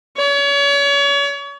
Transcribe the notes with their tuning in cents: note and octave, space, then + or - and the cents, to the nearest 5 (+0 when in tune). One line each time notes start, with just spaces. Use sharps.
C#5 +35